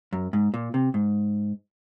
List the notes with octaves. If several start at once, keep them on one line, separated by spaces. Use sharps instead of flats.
F#2
G#2
A#2
C3
G#2